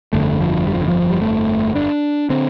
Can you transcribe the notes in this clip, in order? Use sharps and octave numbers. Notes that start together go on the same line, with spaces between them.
G1 F2 D3 A3
F3
G3
F3
D3
F3
G3
A3
D4
D3 C4